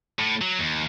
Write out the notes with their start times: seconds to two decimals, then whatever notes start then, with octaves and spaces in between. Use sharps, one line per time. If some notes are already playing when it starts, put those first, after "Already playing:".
0.19 A2
0.41 F#3
0.59 D#2